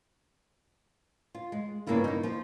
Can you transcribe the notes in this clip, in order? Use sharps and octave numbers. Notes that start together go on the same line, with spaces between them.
F4
G#3
G2 C#3 A#3 B3 E4 F4
D#4 E4
F3